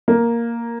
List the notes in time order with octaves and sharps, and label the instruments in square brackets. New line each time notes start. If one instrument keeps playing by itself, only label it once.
[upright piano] A#3